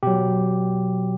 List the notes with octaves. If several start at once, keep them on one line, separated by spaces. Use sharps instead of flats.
B2 F#3 G4